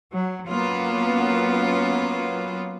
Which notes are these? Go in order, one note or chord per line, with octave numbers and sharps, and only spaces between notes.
F#3
F#3 A#3 B3 C#4 F4